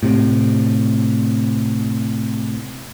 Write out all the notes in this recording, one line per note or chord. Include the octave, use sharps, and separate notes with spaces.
A2 C3